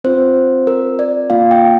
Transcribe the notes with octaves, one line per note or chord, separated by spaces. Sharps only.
C4 F4 C5
A#4
D5
A#3 F4 F5
G5